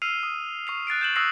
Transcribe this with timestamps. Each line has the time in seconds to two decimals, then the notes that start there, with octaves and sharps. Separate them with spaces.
0.02 E6 F6 C7 D#7 F7
0.23 D#6
0.67 C#6 C7 F7
0.87 F#6 A6 C7 D7
1.01 G6 E7 F#7
1.16 C#6 D#6 E6 F#6 A#6 C7